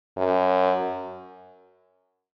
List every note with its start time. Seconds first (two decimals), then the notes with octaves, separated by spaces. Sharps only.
0.17 F#2